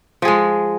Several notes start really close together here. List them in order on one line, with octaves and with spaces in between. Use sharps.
F3 G#4 G#3